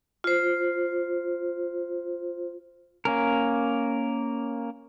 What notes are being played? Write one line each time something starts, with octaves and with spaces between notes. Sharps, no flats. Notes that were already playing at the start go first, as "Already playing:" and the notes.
F4 C5
A#3 C#4 A#4